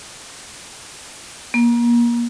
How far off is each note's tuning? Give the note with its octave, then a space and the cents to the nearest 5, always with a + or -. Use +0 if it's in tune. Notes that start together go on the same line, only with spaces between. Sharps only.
A#3 +30